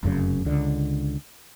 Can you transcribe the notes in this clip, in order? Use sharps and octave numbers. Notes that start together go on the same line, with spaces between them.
F1 F#2 A#2 C#3
C#2 D3